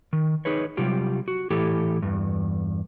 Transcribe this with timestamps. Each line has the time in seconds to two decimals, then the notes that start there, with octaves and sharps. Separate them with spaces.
0.13 D#3
0.45 D#4 G#4 B4 C#5
0.77 C3 F#3 G3 F4 G4
1.28 F#4
1.50 A2 E3 E4 G4 A4
2.02 E2 G2